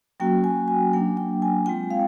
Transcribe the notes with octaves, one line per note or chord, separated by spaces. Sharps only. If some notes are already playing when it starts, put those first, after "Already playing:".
F#3 A#3 C#4 F#4 G5
G#5
G#5
F#3 A#3 D4 G5
G5
G#5
G#3 C4 F4 G5
F5